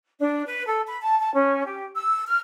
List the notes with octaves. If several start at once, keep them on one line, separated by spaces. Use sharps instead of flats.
D4
B4
A4
B5
A5
A5
C#4
G4
E6
F6